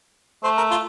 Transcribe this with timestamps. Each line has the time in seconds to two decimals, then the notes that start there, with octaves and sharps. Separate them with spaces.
0.43 A3 C5
0.57 A#4
0.70 F4